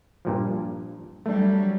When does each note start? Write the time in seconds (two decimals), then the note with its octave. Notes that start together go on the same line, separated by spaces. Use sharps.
0.25 G2 A#2 F3
1.26 F#3 G3 A3 D4